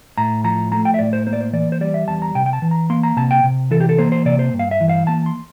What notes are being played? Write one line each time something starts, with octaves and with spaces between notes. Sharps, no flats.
A2 A#5
F3 A#5
A3 A#5
G5
E5
A2 D5
C5
A#3 C5
D5
C5
E3 D5
C5
G3 D5
E5
E2 A5
A#5
C3 G5
G5
A5
E3
A#5
A#3 C6
A#5
C3 A5
G5
C3
E3 A4
G4
A4
A#3 C5
C5
C3 D5
C5
G2
F5
E5
E3
F5
A#3 A5
C6